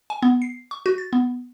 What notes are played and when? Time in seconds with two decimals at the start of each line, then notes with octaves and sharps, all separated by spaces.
0.10 G#5
0.22 B3
0.42 C7
0.71 C#6
0.86 F#4
0.98 A6
1.13 B3